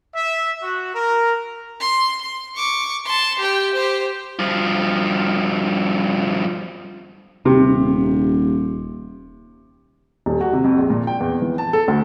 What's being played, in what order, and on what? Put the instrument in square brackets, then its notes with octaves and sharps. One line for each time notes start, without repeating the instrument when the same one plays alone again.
[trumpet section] E5
F#4
A#4
[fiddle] C6
C6
C#6 D6
A5 C6
G4 G5
G4 C5
[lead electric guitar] G2 F3
[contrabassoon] D#1 [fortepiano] C3
[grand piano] D#1
F#4
C3
F2
A#1
A#2
G5
E2
E3
A5
A4
D2